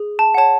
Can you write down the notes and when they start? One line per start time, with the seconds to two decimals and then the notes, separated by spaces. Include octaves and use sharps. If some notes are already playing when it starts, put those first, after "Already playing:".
Already playing: G#4
0.19 A5
0.34 C#5 F#5 A5